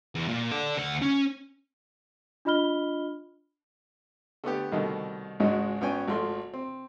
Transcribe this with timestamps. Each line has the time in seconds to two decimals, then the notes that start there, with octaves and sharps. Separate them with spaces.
0.15 E2
0.29 A#2
0.52 A4 D5
0.77 D2 F#5
1.02 C#4
2.45 D4 F4 D#5 B5 F6 G7
4.44 D3 A3 B3 G4
4.72 C2 B2 D#3 A3
5.40 G#1 C#2 G#2 G#3 F#4
5.81 G#1 B3 C#4 G5 G#5
6.08 G#1 F3 A3 C6
6.54 C4